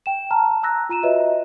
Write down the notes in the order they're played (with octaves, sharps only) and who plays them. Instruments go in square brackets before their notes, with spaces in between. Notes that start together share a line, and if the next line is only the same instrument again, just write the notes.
[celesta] G5 E7
A5 A#5 F6
A#5 E6 F#6 A#6
F4 A#5 D#7 E7
F4 F#4 B4 C#5 D#5 E5